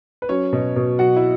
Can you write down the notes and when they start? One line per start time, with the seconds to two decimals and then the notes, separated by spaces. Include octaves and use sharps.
0.22 B4
0.29 F#3 C#4 C#5
0.53 B2
0.76 B2
0.99 F#3 F#4 F#5
1.16 E4 E5